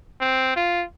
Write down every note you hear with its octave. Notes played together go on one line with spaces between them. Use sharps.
C4
F4